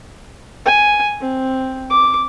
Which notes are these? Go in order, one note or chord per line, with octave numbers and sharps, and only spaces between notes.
G#5
C4
D6